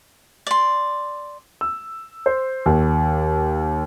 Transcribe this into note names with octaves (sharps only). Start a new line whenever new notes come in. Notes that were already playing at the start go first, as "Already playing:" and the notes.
D5 C6
E6
C5
D#2